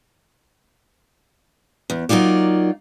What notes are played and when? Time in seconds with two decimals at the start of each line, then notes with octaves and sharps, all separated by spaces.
1.90 E2
2.09 F#3 A#3 D#4 F4 D5